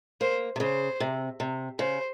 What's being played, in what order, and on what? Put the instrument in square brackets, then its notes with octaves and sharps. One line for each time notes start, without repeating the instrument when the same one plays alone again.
[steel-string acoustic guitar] A#3 [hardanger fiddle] C5
[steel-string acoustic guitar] C3
[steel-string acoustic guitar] C#3 [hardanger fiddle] C5
[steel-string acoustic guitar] C3
C3
[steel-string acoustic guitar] C#3 [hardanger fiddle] C5